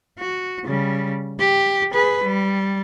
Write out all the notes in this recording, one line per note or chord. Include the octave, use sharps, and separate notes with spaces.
F#4
C#3 G3
G4
G#4 B4
G3